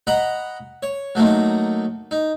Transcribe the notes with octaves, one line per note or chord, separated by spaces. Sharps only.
D#5 F#5 A#5 B5
C#5
F#3 A3 A#3 D#4
D#4